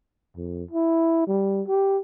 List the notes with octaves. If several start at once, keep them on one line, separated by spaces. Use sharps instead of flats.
F2
E4
G3
G4